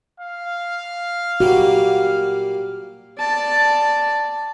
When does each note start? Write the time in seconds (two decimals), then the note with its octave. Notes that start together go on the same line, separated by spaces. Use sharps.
0.20 F5
1.40 A#2 G3 A#3 F#4
3.18 D5 A5